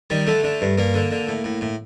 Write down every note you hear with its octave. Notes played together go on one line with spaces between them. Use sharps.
D#3 G3
D3 A3
D3
G2
G2 A#3
D3
D3
A2
A2
A2